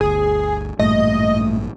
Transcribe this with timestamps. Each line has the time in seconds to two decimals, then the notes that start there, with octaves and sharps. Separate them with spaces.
0.01 G1 D2 G#4
0.79 A1 G2 A#2 A3 D#5